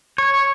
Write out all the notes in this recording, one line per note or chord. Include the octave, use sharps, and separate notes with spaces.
C#5